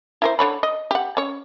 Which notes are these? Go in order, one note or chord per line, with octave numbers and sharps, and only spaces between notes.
E4 A#4 C5
D3 C#5 B5
D#5
G4 F#5
C#4 C#5